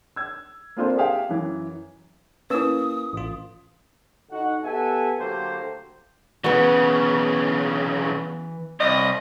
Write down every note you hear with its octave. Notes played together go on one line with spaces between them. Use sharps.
E6 G#6
A#3 C4 D4 F4 A4 C5
G4 G#4 E5 F5 G5
F#2 E3
A#3 C#4 E4 B4 D#6 E6
A1 F4
D3 D#4 F#4 F#5
B3 G4 A4 E5 F#5 G#5
D3 F#3 A3 A#3 G4 C5
B1 C#3 E3 B3 F#4
C2 D#5